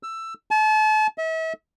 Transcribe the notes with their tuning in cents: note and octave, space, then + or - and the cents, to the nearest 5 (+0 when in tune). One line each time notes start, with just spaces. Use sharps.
E6 +15
A5 -35
E5 -40